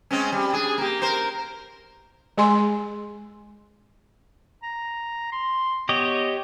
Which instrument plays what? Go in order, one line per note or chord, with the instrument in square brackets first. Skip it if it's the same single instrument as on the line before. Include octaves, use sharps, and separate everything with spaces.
[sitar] G#3 C4 C#4
G3
D4 G#4
A#3 G4
A#4 C5
[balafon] G#3 G#4 G#5 C6
[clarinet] A#5
C6
[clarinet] B3 [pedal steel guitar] G4 C#5 D#5